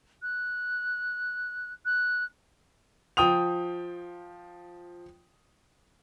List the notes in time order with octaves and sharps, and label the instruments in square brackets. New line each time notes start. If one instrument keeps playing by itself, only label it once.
[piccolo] F#6
F#6
[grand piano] F3 G5 D#6 F7